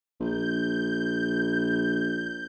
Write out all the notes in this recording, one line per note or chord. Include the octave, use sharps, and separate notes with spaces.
A#1 G6